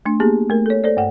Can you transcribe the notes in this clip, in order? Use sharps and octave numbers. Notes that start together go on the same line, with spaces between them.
A3 D4
A#3 B3 G4 G#4
A3 A#4
A4 C#5
A4 C5 D5
G2 F#5